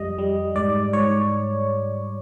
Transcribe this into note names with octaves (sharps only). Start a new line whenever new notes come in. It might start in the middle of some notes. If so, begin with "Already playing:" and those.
Already playing: F2 G3 D#5
G3
G#2 D5
G#2 C#5